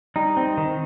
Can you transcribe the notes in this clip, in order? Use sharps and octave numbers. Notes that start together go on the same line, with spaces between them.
G3 D#4
C4
D#3